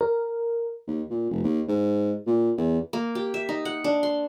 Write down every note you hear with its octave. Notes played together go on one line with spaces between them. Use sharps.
A#4
D#2
A#2
F1
D#2
G#2
A#2
E2
A#3
G4
E5
D#4
F#5
D4
C6